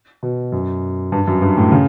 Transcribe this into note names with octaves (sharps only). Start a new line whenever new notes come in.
B2
F#2
G2
F#2
G2
A2
C#3